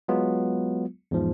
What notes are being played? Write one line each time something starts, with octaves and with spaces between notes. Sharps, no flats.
F#3 G#3 B3 F4
E2 G#2 F3